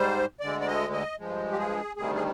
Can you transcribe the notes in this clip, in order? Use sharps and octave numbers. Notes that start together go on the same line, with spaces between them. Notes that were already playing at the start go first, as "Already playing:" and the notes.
Already playing: G#2 G3 C5
D2 D3 G#3 D5
D5
D#5
D#5
G2 F3 G#3
G4
G#4
D2 C3 D#3 G3 G#4
G#4